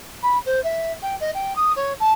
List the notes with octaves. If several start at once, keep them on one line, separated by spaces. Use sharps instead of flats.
B5
C5
E5
G5
D#5
G5
D#6
C#5
A5